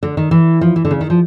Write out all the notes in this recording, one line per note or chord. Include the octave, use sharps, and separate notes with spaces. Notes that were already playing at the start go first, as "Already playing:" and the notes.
D3
D#3
E3
F3
E3
D3
C#3
D#3
F3